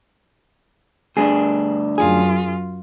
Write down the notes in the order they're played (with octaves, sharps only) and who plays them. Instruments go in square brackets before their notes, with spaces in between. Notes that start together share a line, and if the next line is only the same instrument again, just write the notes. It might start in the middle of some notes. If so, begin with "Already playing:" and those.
[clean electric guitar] D2 G2 D4 [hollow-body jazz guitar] G#4
[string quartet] F#2 F4 [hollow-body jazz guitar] G#4